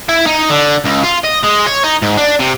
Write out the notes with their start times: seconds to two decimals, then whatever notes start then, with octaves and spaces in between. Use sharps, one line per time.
0.09 E4
0.27 D#4
0.50 D3
0.85 C#2
1.04 F4
1.25 D#5
1.44 G#3
1.67 C#5
1.84 D#4
2.02 G#2
2.18 D4
2.40 C3